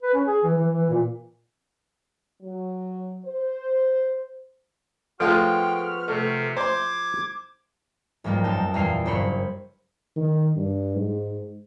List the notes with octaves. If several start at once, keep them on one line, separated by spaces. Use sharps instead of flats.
B4
C#4
G#4
E3
E3
E3
A#2
F#3
C5
F3 G#3 A3 B3 F4 F#4 G5 F6
C3 A3
C5 C6 D6 G#6
B1 G#2 F3 G3 A#3
F#2 D#4 A5 G6
E2 A#2 G3 F5 G5 C7
F#1 G2 C5 C#5 B5 C#7
D#3
G2
G#2